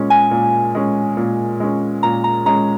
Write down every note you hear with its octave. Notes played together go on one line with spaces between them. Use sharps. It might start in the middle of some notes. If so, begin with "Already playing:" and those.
Already playing: A#2 G#3 C#4
G#5
A#2
G#3 C#4
A#2
G#3 C#4
A#2 A#5
A#5
G#3 C#4 A#5